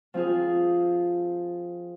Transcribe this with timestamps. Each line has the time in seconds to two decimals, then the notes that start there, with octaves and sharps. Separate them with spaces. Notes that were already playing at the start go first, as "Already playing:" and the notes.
0.14 F3 C4 F4 G#4